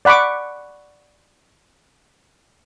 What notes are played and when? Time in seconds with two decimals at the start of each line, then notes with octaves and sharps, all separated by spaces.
0.05 D5 F#5 B5 C#6 D6